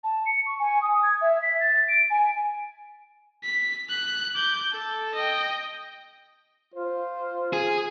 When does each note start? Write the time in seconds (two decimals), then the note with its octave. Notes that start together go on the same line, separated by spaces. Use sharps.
0.04 A5
0.26 C#7
0.46 C#6
0.60 G#5
0.82 D#6
1.03 G#6
1.21 E5
1.42 B6
1.60 A6
1.88 D7
2.10 G#5
3.44 B6
3.89 F#6
4.35 D6 G6
4.71 A4
5.14 D#5 G5
6.74 F4 C5
7.53 G#4